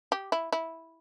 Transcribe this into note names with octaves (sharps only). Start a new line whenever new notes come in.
G4
E4
E4